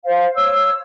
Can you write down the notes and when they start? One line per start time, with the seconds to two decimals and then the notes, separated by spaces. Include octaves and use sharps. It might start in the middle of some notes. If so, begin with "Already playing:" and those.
0.04 C5 F5
0.35 C#5 E6